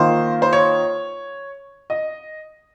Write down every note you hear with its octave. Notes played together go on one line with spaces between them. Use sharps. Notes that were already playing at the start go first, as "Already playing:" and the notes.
Already playing: D#3 A#3 F4 C5
C5
C#5
D#5